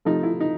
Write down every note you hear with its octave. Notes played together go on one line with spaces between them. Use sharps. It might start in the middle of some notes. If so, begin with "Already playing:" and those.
C3 F3 A3 D#4
E4
D#4